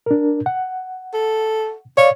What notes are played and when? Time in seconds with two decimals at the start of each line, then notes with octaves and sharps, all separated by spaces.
0.06 D4 A#4
0.46 F#5
1.14 A4
1.97 C#5 D5 F5